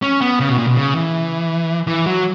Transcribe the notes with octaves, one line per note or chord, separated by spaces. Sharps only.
C#4
B3
C#3
B2
A#2
B2
C#3
E3
E3
F#3